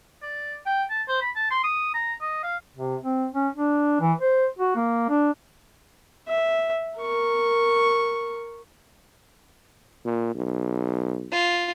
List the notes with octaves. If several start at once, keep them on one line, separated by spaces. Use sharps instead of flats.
D5
G5
A5
C5
B5
A5
C6
D#6
A#5
D#5
F5
C3
C4
C#4
D4
E3
C5
F#4
A#3
D4
E5
A#4 C#6
A#2
B1
F4